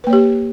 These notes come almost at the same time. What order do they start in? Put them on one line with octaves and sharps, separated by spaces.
B4 A#3 C#5 G4